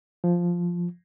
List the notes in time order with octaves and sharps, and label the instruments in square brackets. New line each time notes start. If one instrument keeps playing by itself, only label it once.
[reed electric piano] F3